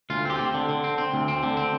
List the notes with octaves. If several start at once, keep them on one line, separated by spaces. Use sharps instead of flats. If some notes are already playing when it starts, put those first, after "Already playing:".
D2 F4
C4 G4
C4
D3
D3
C4
C4
D2
C4
D3
C4